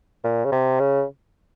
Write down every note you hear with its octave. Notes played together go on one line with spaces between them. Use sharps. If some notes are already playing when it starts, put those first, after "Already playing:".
A#2
C#3
C3
C#3